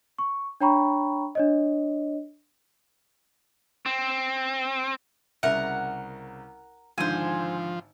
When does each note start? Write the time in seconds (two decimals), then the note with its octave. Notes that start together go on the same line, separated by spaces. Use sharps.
0.19 C#6
0.61 D4 C#5 G5 A#5 B5 C#6
1.35 D4 C#5 D#5
3.86 C4
5.43 C2 C#3 A#4 E5 F#5
6.98 G#1 G#2 D3 F3 C5 G#5